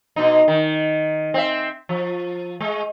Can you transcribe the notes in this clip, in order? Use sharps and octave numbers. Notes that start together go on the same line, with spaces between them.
B2 D#4
D#3
C4 E5
F3
G#3